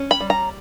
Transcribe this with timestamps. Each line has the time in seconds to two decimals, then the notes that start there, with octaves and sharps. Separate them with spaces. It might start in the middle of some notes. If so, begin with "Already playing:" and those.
Already playing: C#4
0.11 B5
0.20 G3
0.30 A#5